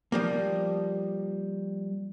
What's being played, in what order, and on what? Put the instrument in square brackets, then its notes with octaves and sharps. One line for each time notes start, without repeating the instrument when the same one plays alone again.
[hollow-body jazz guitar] F3 G3 A#3